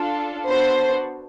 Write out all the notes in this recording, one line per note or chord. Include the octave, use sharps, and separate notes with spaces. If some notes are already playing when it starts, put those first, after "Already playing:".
Already playing: D4 F4 A4
B3 D4 F#4 A4 C5